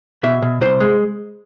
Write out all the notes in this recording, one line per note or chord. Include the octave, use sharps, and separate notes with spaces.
B2 E5
B2
C2 C5
G#3